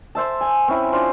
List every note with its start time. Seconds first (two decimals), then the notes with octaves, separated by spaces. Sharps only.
0.15 A4 C5 E5 A5
0.41 G#5
0.68 C4 C#4 E4
0.92 D4 F4 C5